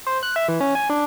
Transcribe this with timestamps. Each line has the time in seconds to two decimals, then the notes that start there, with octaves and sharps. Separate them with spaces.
0.06 C5
0.23 F#6
0.36 E5
0.48 E3
0.60 C#4
0.75 G#5
0.90 D4